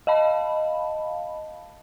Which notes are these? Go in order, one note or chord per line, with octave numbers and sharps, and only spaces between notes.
D#5 F5 A5 B5